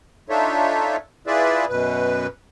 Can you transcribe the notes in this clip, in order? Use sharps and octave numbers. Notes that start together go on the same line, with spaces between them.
D4 D#4 F4 A4 C#5 E5
E4 F4 G#4 B4 D5 E5
F#2 B2 B4